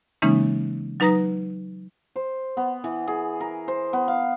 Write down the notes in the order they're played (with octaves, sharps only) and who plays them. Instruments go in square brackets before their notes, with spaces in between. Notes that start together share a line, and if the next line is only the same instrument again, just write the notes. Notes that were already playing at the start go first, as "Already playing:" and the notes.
[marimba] C#3 E3 G#3 A#3 C#4 D#4
F#3 D#4 B4 A#5 D#6 A#6
[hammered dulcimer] C5
B3
E3
G#4
A#4
C5
B3
F5